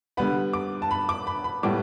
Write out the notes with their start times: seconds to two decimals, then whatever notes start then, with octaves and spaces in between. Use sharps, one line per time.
0.17 D3 G3 B3 B5
0.53 D6
0.82 A5
0.91 B5
1.09 D6
1.27 B5
1.44 B5
1.63 A2 G3 B3 D6